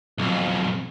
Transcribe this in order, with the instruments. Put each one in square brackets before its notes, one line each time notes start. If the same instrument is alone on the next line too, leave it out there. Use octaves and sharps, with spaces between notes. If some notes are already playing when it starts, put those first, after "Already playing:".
[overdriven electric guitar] B1 F2